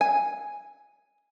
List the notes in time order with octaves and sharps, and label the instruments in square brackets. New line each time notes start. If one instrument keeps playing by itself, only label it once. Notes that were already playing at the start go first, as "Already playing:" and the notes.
[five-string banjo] G#5